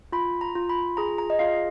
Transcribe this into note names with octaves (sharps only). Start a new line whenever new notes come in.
F4 B5
A#5
F4
B5
G#4 A#5
A#5
D#5
F4 F5